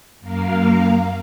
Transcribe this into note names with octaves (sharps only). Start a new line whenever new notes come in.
F#2 A#3 A#4 F5